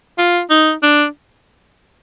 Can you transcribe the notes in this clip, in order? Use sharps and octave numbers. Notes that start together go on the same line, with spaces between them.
F4
D#4
D4